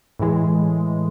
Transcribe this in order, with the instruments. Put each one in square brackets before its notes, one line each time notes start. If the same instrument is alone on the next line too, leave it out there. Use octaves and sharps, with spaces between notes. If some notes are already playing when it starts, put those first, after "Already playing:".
[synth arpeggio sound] A2 E3 G#3